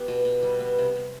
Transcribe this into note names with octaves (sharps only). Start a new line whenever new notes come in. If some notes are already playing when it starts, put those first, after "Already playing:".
Already playing: B3 G4
B2
B2
G3
B3
C3
C3